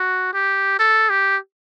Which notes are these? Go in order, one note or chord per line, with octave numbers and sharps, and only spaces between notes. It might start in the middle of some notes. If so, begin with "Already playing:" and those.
Already playing: F#4
G4
A4
G4